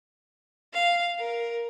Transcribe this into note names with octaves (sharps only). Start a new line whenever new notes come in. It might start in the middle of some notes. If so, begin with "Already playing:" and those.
F5
A#4